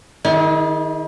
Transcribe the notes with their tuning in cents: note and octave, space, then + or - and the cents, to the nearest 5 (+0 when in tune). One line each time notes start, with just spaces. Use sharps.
D#3 +0 E4 -40 G#4 -15